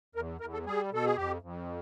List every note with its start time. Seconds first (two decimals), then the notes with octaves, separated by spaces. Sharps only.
0.15 E2 A#4
0.41 E2 A#4
0.53 A4
0.66 G3 G#4
0.91 B2 A4
1.05 G#4
1.17 F2 G4
1.42 F2